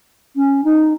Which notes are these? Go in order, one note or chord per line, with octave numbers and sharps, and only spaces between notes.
C#4
D#4